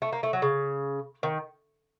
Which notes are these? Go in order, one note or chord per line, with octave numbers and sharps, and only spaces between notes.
A3
A#3
A3
F#3
C#3
D#3